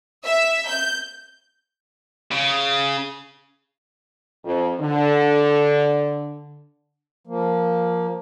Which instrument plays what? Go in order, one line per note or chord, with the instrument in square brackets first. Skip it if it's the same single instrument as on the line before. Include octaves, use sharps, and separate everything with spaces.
[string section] E5
G6
[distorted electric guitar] C#3
[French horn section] F2
D3
[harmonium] F3 A#3